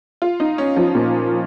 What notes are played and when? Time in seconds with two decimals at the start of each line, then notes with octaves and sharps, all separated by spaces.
0.22 F4
0.40 D#4
0.58 C#4
0.77 F3
0.95 A#2